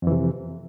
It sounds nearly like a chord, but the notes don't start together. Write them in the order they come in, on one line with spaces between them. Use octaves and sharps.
F2 E3 C3